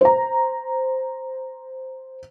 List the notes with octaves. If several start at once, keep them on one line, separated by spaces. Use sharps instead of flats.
C5 A#5